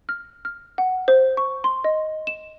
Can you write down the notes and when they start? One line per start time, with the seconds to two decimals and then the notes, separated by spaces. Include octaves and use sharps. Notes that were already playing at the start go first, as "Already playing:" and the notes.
0.09 F6
0.45 F6
0.78 F#5
1.08 C5
1.37 C#6
1.64 C6
1.84 D#5
2.27 E7